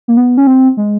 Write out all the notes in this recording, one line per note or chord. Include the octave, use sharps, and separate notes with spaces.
A#3
B3
C#4
C4
G#3